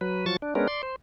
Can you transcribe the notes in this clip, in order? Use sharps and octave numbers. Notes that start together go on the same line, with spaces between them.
F#3 B4
F3 F#3 A5 C#6 A6
D4
G#3 B3 C#4 D4 A#4
D5 C6
C5